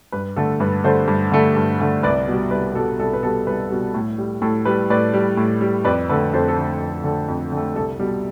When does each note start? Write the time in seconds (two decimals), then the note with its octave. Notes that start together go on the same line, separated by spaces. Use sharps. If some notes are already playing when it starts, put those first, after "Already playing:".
0.12 G2 B4
0.36 D3 A3 A4
0.60 G2 B4
0.84 D3 A3 A4 C5
1.08 G2
1.32 D3 A3
1.57 G2
1.81 D3 A3
2.03 C2 B4 D5
2.28 B2 G3
2.51 C2 B4
2.75 B2 G3 A4
2.99 C2 A4
3.13 B4
3.22 B2 A4
3.26 G3
3.47 C2 B4
3.70 B2 G3
3.94 A2
4.18 G3
4.42 A2 A4
4.65 G3 B4
4.90 A2 B4 D5
5.13 G3
5.37 A2
5.61 G3
5.85 F2 B4 D5
6.09 D3 A3 B4
6.33 F2 A4 C5
6.48 A4
6.57 D3 A3
6.80 F2
7.04 D3 A3
7.28 F2
7.52 D3 A3
7.75 C2 A4
7.99 B2 G3